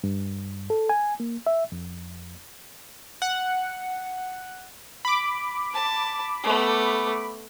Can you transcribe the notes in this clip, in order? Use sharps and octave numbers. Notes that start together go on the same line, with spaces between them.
G2
A4
G#5
A#3
E5
F2
F#5
B5 D6
A5
A3 B3